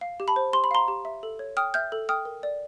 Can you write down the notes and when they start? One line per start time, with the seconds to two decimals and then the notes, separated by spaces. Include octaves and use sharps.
0.01 F5
0.20 G4
0.28 A5 B5
0.36 C5
0.53 G4 C6
0.64 B5
0.71 F5 A#5 C6
0.88 G4
1.05 E5
1.23 A4
1.39 C#5
1.57 G5 D#6 F6
1.74 E5 F6 G6
1.92 A4
2.09 G5 D#6 F6
2.25 A#4
2.43 D5